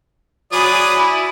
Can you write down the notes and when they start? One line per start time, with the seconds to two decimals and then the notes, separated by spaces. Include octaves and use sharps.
0.52 F#3 G#4 D5 B5 D#6
0.97 E4